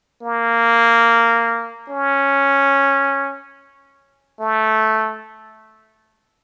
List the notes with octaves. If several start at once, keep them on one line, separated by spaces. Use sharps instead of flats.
A#3
C#4
A3